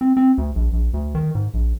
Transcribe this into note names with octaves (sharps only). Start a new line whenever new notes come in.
C4
C4
D2
A#1
A#1
D2
D#3
G#2
A#1